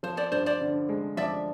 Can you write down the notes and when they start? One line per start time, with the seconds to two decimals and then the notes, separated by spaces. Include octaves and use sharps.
0.03 F3 C5
0.17 C5 D5
0.31 G2 C5 D5
0.46 C5 D5
0.61 D3
0.89 G#3
1.17 F3 D5 E5